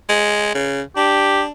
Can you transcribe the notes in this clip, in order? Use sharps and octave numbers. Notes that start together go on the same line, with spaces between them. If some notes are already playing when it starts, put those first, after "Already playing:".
G#3
C#3
D4 G4